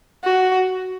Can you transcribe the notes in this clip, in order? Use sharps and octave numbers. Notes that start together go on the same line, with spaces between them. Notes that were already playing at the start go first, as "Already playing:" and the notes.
F#4